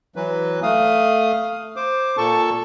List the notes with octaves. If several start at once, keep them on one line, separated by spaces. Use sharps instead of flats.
E3 F#3 B4
A3 F5 D#6
C5 D6
A#2 A4 A5 C#6